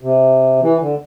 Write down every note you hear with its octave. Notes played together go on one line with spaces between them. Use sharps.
C3
E3
D3